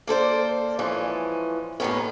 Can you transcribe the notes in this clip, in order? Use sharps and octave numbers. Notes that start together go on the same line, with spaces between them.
A#3 A4 C5 D5
E3 F3 G#3 C#4
D#2 A2 D#3 B3 C#4